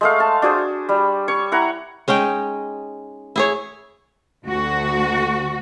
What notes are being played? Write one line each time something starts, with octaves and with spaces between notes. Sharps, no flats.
G#3 A3 F5
A5
D4 F#4 G#4 C5
G3
C#5 C#6
E4 F#5 A#5
G#3 C#4 D#4 G5
E4 G#4 C#5
D2 F#4